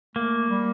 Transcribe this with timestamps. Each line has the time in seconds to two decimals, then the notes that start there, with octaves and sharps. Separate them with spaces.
0.16 A3 A#3
0.50 G3